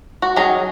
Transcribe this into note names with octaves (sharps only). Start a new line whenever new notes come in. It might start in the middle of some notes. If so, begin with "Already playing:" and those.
F#4
D#3 F#3 C#4 G#4